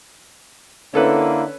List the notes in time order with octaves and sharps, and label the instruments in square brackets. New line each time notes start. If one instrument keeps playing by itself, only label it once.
[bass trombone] D3 [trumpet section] A#3 E4 [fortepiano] C#4 A4 B4